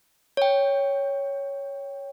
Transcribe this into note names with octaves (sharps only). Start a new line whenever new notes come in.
C#5 G5